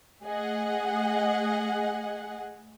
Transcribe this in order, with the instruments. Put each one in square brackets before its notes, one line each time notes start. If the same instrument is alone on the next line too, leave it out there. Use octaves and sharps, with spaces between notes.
[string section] A3 G#4 D#5 F#5